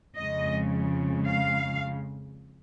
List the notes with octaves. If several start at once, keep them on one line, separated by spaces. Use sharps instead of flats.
F2 C#3 G#3 D#5
F5